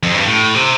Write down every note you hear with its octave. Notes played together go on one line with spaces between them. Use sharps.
F2
G2
A2
C3